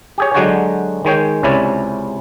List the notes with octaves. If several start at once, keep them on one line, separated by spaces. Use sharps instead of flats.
G4 G#4 C#5
D3 F#3 G#3 F#4 G4 C#5
D#3 G#3 C#5 G5
C#2 C3 C#4 E4 C#5 D5